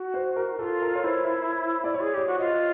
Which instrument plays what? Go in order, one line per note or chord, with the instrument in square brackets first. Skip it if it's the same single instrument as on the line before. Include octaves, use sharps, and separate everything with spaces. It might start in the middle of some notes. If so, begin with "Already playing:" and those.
Already playing: [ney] F#4
[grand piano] C5
A#4
[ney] E4
[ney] F4 [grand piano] A4
[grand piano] A#4
C#5
[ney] E4 [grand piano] C5
[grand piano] D5
C#5
[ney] G#4
[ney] G4 [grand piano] C#5
[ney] F#4
[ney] F4 [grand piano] D#5